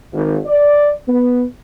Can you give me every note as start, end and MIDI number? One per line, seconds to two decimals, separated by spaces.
0.12 0.37 32
0.45 0.92 74
1.07 1.43 59